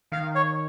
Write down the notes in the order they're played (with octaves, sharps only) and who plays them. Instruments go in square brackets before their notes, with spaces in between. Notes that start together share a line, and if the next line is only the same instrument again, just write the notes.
[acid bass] D#3 [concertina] F5
[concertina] C#5